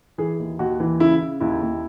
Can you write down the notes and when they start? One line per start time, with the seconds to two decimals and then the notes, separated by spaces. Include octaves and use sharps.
0.18 E3 G#4
0.39 D#2
0.59 D#2 F#4
0.80 E3
1.00 C#3 E4
1.20 C#3
1.40 D#2 E4
1.61 D#2